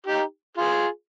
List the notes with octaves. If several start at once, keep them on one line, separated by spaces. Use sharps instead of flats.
D#4 G4
F4 G#4